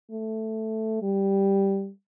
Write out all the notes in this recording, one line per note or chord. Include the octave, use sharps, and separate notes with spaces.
A3
G3